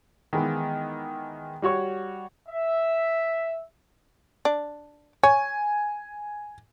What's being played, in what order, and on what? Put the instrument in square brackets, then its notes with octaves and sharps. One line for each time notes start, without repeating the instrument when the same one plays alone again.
[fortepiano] D#3 E3 G#3 B3
G3 F#4 C#5 C#6
[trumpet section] E5
[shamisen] D4
[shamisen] C#5 [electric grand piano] G#5